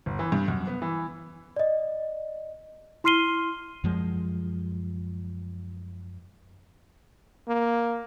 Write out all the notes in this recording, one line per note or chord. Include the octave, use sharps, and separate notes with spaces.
G1
E3
G2
F#2
B3
E3
D5 D#5
E4 C6 F6 C7 D#7 G7
F#2 F3 G#3
A#3